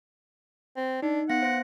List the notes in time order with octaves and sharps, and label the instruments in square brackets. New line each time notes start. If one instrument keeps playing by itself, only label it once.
[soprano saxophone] C4
[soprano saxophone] D4 [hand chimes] D#4
[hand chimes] B3 F5 A#6 [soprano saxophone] F#5
[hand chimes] C5 A#6